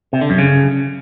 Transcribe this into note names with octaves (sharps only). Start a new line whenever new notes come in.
C3
D3
F#2
C#3